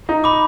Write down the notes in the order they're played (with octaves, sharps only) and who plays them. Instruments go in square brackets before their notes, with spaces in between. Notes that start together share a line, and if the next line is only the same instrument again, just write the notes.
[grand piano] D#4
[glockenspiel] B5 D6